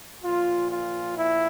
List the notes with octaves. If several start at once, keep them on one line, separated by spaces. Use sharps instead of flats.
A#2 F3 F4
F4
E4